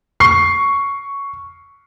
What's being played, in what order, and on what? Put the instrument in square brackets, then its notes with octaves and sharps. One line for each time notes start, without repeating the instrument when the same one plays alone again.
[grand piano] C#6 C7